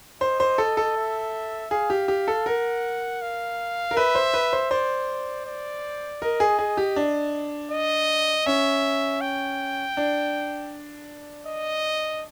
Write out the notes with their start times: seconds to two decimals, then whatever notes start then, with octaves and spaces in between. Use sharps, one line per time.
0.21 C5 D#5
0.40 C5
0.58 A4
0.77 A4
0.96 E5
1.71 G#4 F5
1.90 G4
2.08 G4
2.28 A4
2.46 A#4 F#5
3.22 F5
3.91 A#4
3.97 B4 E5
4.15 C5
4.34 B4
4.53 C5
4.71 C5 D5
5.46 D5
6.22 A#4 D#5
6.40 G#4
6.59 G#4
6.77 G4
6.96 D4
7.71 D#5
8.46 C#4 E5
9.21 G5
9.97 D4
11.46 D#5